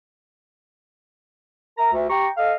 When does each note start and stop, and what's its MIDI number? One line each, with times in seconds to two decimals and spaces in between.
1.78 1.90 70
1.78 1.90 76
1.78 1.90 82
1.93 2.06 38
2.10 2.27 67
2.10 2.27 79
2.10 2.27 82
2.10 2.27 85
2.37 2.53 69
2.37 2.53 75
2.37 2.53 77